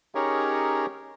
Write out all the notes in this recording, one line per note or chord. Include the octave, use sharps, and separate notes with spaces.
C#4 D#4 G4 G#4 A#4 C#5